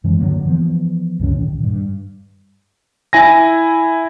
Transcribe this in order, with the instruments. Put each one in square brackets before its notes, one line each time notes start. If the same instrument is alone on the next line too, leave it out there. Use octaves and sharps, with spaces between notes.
[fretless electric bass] F#2 E3 G#3 C#4
G2 D3 F#3 A#3
E3 F3 G#3 B3
C#2 F#2 D3 C#4
A#2 D#3
G2
[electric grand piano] E4 G#5 A#6